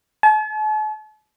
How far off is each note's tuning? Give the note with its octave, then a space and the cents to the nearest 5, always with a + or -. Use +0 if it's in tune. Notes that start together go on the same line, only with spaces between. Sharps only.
A5 -45